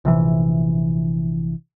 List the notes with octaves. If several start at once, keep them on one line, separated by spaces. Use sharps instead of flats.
A#1 C3 E3